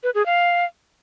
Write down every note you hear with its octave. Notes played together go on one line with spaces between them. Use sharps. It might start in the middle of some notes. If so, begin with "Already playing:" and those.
B4
G#4
F5